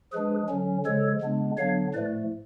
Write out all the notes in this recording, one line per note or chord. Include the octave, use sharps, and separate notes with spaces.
F3 G#3 D4 G#4 B4
D3 F#3 C#4
C#3 F3 G#3 A4 C#5
C#3 G#3 B3 D4
D3 F#3 B3 D4 C#5 F5
A2 F3 A3 B4 D5